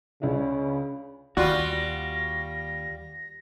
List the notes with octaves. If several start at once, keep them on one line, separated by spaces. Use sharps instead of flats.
C#2 C#3 D4
D#2 G3 F4 F#4 A#6